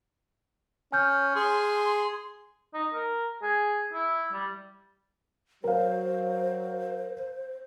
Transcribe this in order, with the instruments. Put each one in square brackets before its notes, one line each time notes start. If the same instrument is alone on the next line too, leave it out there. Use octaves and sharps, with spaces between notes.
[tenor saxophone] C#4 [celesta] G#5 F6 G6
[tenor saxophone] G#4 [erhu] C6
[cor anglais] D#4
A#4
G#4
E4
G3
[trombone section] F#3 [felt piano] A#4 F5 [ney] C5